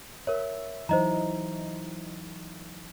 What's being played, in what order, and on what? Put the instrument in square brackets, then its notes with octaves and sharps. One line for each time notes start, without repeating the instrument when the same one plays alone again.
[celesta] A#4 C#5 [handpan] E5
[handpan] E3 F#3 D#4 [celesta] C5 D#5 A#5